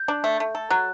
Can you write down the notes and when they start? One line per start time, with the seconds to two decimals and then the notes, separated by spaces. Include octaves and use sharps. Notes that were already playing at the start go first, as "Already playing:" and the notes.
Already playing: G6
0.08 D4
0.24 A3
0.40 A3
0.55 A4
0.70 F#3 F#6